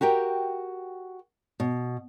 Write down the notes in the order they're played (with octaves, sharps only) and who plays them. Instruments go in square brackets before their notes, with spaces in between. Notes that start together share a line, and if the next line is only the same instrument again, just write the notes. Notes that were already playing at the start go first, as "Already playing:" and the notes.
[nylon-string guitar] F#4 G4 A#4 G5
B2